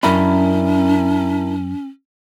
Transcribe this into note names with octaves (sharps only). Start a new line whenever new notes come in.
F#2 C#4 D4 E4 A#4 A#5 B5